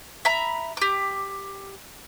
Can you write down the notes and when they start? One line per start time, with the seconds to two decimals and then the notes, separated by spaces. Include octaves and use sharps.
0.25 E5 A#5 B5
0.77 G4 D6